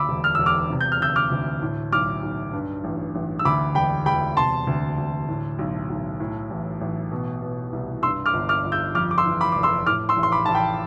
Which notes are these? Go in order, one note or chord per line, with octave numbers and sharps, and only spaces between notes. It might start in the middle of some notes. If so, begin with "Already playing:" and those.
Already playing: D2 B5 D6 E6
E1
F6
E1 E6
D6 F6
C3
G6
F6
D2 E6 G6
D6 F6
D2
A2
B1 D6 F6
B1
G2
A1
A1
E6
D2 B5 D6
E1 G5 B5
E1 G5 B5
C3 A5 C6
D2
D2
A2
B1
B1
A2
A1
A1
B2
B2
C2
G2 C6 E6
D6 F6
G1
D6 F6
G1
E6 G6
F2 D6 F6
D6
C6 E6
E3
B5 D6
F1 D6
C6 E6
A2 D6 F6
C6 E6
A1
C6
B5 D6
A1 A5
G5 B5